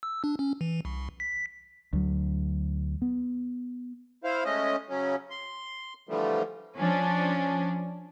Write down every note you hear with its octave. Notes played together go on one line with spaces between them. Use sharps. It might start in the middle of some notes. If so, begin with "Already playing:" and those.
E6
D4
C#4
E3
C2
B6
D2 F#3
B3
E4 C5 F5
G#3 A3 C#4 D#5
C#3 F#3 C#4
C6
D3 E3 F3 G3 A3
F3 C#4 D4